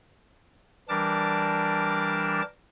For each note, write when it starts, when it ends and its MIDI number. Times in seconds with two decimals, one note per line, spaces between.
0.89 2.42 52
0.89 2.42 55
0.89 2.42 62
0.89 2.42 70
0.89 2.42 81
0.89 2.42 86